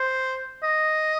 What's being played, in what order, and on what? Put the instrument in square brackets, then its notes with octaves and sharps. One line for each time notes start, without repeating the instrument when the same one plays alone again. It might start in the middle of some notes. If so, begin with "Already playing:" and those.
Already playing: [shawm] C5
D#5